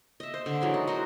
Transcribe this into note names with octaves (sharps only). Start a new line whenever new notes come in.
D#5 E5
C5
D3
E3 F#3 G#3 D4
D#4
F#4 A#4 C5 D#5